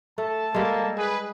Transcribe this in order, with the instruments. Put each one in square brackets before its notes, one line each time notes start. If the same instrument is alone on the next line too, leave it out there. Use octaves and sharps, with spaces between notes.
[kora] A3 [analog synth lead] A4 [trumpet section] A5
[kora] G3 G#3 [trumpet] A#3
[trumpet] G#4 [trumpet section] B4